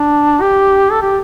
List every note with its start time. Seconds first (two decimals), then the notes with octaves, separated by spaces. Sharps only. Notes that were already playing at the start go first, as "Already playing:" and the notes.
Already playing: D4
0.41 G4
0.91 A4
1.02 G4